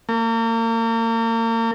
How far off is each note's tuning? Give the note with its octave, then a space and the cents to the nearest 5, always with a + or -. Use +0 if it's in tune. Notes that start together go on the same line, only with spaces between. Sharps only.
A#3 -40